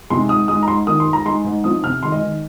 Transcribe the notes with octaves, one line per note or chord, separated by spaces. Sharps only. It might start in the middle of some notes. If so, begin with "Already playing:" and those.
C3 G#3 D#4 C6
G#2 D#6
G#3 D#4 D#6
A#5
G#2 C6
D#3 A#3 D#6
C6
G#2
A#5
G#3 D#4 C6
G#2
F3 C4 D#4 D#6
C3 F6
D#3 G#3 C6
D#5
D#3